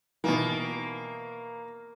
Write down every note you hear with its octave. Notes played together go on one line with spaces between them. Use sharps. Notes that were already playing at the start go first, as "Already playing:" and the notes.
B2 D#3 E3 A#3